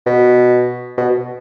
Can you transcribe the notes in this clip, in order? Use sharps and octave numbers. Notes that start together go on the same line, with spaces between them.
B2
B2